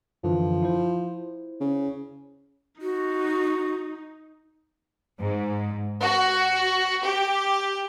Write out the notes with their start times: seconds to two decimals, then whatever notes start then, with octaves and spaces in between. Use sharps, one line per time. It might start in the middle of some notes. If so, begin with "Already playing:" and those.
0.24 F#2 D3 E3 F3
0.63 E4 C5
1.61 C#3
2.81 D#4 F#4
5.19 G#2
6.01 F#4
7.04 G4